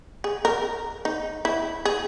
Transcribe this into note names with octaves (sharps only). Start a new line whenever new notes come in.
G#4
A#4
D#4
E4
G#4